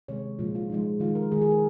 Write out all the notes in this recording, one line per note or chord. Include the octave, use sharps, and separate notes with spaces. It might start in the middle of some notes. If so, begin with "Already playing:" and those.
C3 D#3 G#3 C#5
A#2 F3 G#3 F4
F4
A#2 F3 G#3 D#4
D#3 G#3 F4
A#4
D#3 G#3 G#4
G#4
A#4